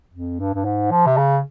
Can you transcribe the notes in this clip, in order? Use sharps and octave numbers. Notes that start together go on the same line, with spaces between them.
F2
G2
G2
G#2
F3
C3
C#3